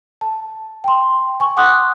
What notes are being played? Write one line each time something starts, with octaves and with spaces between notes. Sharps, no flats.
A5
G5 C6
G#5 C#6
F#5 C6 D6 D#6 F#6